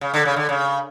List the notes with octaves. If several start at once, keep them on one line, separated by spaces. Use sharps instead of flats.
C#3
D3
C#3
D3
C#3